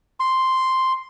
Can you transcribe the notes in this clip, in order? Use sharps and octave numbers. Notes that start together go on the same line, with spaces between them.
C6